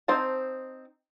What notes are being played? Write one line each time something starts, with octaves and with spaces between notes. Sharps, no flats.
C4 D#4 C5 A5